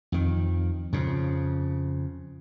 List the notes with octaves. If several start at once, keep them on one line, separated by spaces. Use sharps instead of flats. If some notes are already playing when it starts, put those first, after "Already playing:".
F2 D#3
F2 C#3